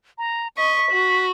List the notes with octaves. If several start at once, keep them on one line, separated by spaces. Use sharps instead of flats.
A#5
D#5 C#6 B6
F#4